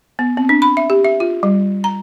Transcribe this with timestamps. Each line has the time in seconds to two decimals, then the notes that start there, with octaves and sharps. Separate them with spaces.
0.19 B3
0.37 C4
0.49 D4
0.62 B5
0.77 E5
0.90 G4
1.05 E5
1.20 F4
1.43 G3
1.84 A#5